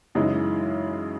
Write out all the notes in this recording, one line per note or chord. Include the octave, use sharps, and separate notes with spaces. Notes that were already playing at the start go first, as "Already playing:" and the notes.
F#2 C#3 E3 G#3 D#4